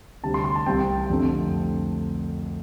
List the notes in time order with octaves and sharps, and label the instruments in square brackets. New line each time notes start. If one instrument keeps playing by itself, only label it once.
[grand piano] D2 C3 G3 C4 A5
C6
C6
A5
C2 C3 G3 C4 G5
F2 D3 A3 C4